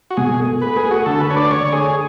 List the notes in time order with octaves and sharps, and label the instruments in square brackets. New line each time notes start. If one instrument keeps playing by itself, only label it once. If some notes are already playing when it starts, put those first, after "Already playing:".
[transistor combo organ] F#4
[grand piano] B2 [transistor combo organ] G#4
[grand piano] A3
[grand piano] A3 [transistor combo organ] B4
[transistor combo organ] G#4
[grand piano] A3
[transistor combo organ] F#4
[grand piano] D3 [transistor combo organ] A4
[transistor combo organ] B4
[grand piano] D4 [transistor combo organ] C#5
[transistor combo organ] D5
[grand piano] D3 [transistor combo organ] C#5
[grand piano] A3 [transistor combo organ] G#4